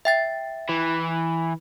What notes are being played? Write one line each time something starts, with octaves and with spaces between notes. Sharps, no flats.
E5 G5 A6
E3